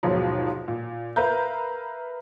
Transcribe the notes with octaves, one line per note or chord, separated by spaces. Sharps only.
G1 D#2 G#2 B2 F3 F#3
A#2
A#4 B4 E5 F5 A#5 G6